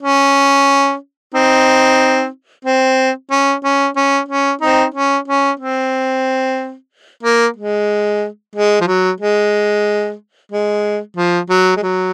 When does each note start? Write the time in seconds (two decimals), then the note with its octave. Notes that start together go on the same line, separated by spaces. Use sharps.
0.03 C#4
1.34 C4 D#4
2.65 C4
3.31 C#4
3.64 C#4
3.96 C#4
4.28 C#4
4.61 C4 D#4
4.95 C#4
5.28 C#4
5.60 C4
7.23 A#3
7.57 G#3
8.55 G#3
8.81 F3
8.87 F#3
9.21 G#3
10.52 G#3
11.17 F3
11.50 F#3
11.77 G#3
11.83 F#3